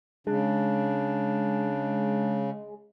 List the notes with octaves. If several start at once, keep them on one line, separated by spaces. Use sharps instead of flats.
C#3 G#3 D4